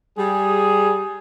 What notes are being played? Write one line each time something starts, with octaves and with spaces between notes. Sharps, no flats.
G3 G#4